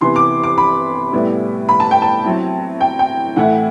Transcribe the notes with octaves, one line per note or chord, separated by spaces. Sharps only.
C3 E3 B3 C6
D6
D6
B5
A2 G3 B3 E4
B5
A5
G5
A5
F#3 C4 E4
G5
G5
A2 E3 A3 E4 F#5